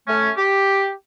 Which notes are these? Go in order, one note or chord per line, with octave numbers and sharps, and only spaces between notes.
A3 C#4
G4